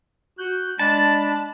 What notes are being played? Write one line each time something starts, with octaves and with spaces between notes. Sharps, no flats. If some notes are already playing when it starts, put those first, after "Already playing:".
F#4 F#6 G6
G#3 D4 A5 B5